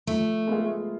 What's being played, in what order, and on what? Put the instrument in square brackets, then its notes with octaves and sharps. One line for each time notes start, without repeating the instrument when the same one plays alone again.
[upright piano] F3 [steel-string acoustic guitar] A3
[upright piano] G#3 B3 F4 G#4